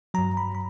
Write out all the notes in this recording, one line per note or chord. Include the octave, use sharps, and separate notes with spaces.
G2 F#3 A#5
B5
B5